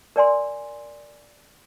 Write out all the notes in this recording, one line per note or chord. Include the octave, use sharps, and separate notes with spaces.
A#4 D5 G#5 C6